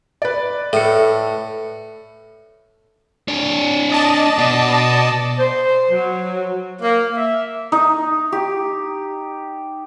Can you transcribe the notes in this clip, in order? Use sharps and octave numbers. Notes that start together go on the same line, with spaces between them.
B4 D5
A2 A4 C#7
D4 C#5
D5 D#5 A5
B2
C5
F#3
A#3
E5
D#4
G4